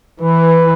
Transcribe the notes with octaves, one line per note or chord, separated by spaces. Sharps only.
E3 B4